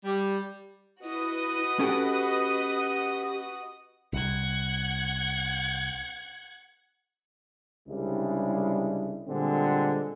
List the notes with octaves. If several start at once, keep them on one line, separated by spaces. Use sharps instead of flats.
G3
E4 F#4 B4 D#5 D#6
C#4 G4 A4 G5
C2 F#5 G#6
C2 C#3 G3 G#3 D4 E4
A#2 D3 G3 G#3 C4 G#4